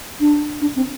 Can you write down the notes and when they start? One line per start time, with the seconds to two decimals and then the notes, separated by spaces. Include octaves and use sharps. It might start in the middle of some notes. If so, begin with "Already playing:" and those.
0.20 D4
0.61 D4
0.76 C4